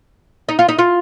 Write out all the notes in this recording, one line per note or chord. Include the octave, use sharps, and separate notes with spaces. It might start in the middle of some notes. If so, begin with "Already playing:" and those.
D#4
F4
D#4
F4